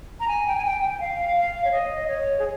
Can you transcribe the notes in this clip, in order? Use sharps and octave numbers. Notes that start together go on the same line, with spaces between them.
A#5
G#5
G5
G#5
G5
G5
F5
F5
C#5
D#5
C#5
G#4